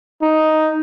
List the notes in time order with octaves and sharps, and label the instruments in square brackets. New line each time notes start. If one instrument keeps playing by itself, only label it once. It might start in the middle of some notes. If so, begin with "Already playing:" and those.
[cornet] D#4